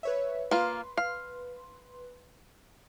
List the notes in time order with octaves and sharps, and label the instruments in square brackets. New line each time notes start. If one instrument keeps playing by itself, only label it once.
[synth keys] B4 C#5 E5
[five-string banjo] A#3 F4 [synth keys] B4 C6
[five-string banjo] F5